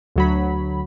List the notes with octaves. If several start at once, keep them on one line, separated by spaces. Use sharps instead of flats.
D2 F#3 B5